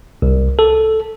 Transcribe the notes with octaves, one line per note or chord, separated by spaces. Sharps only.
C2
A4